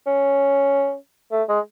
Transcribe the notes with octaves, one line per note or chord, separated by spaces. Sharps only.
C#4
A3
G#3